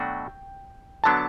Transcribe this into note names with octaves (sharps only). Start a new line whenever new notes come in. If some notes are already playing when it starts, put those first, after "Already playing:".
Already playing: B2 F#3 A3 D4 F#4 G5
D3 F#3 B3 D4 A5